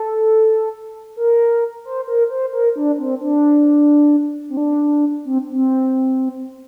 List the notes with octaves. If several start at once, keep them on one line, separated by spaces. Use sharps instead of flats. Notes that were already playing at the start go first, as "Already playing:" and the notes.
Already playing: A4
A#4
C5
A#4
C5
A#4
D4
C4
D4
C4
D4
C4
C4